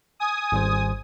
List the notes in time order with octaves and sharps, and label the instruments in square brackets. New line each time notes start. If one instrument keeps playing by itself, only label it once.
[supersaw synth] G#5 D#6
[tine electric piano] G#1 G3 C5